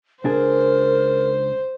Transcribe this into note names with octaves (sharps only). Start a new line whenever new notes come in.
C#2 D4 G#4 A#4 C5